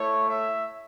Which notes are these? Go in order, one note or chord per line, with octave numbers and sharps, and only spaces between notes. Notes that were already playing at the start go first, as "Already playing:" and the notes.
Already playing: A3 E4 C#5
E5